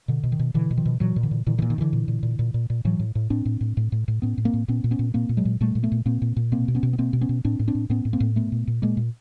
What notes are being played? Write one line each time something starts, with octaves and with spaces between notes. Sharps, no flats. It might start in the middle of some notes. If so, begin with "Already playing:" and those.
B2 D3
B2
D#3
B2
B2 D3 E3
B2
D#3 F3
B2
A#2 E3 F#3
A#2
D3 E3
A#2
A#2 D3 E3
D3 E3
A#2
D#3
A#2
D3 E3
A#2
A#2
A#2
A#2
A#2
A#2
A2 E3 F#3
A2
A2
A2 C4 D4
A2
A2
A2
A2
A2
A2 B3 C#4
A2
A#3 C4
A2
A#2 B3 C#4
A#2
B3 C#4
A#2
A#2 A#3 C4
A#2
F#3 G#3
A#2
A#2 G3 A3
A#2
A3 B3
A#2
A#2 A#3 C4
A#2
A#2
B2 A#3 C4
B2
B3 C#4
B2
B3
B2 A#3 C4
B2
B3 C#4
B2
A2 C4 D4
A2
C4 D4
A2
A2 B3 C#4
A2
A#3 C4
A2
A#2 A3 B3
A#2
A#2
A#2 G#3 A#3
A#2